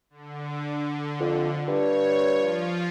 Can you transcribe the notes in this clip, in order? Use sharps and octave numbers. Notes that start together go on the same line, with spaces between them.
D3
F2
G2 C#5
F3 F4